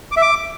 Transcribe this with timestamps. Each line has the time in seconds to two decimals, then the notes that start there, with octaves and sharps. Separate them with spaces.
0.11 D6
0.17 E5
0.22 D6